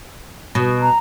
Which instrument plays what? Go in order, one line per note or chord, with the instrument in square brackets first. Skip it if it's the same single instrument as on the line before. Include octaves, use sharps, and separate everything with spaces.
[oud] B2
[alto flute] A#5